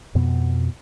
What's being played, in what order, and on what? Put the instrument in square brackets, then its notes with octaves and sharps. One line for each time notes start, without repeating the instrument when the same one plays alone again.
[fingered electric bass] F2 B2 B3